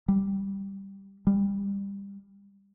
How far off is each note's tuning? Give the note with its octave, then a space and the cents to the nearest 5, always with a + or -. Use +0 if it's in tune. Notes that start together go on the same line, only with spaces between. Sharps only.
G3 +0
G3 +25